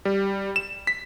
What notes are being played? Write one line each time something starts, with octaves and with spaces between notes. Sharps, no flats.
G3
E7
B6